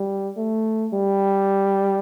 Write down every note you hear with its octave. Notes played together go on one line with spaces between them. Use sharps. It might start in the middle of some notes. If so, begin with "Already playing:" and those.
Already playing: G3
A3
G3